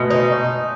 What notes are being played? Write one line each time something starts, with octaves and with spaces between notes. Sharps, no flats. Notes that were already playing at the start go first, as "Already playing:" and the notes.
Already playing: B2 G#3 A3
D#4